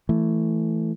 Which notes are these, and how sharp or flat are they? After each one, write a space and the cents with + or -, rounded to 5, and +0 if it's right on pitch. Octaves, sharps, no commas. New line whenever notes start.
E3 +0 A3 +0